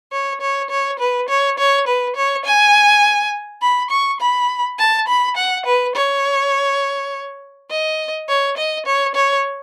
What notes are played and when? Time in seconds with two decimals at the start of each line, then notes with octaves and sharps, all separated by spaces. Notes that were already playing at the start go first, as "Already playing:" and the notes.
0.12 C#5
0.41 C#5
0.70 C#5
0.99 B4
1.29 C#5
1.58 C#5
1.87 B4
2.16 C#5
2.45 G#5
3.62 B5
3.91 C#6
4.21 B5
4.79 A5
5.08 B5
5.37 F#5
5.66 B4
5.96 C#5
7.70 D#5
8.29 C#5
8.57 D#5
8.86 C#5
9.15 C#5